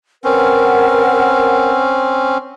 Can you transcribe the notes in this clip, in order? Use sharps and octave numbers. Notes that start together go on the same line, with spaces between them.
C4 C#4 A#4 B4 F#5